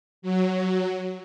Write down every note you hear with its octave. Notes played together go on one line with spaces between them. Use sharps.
F#3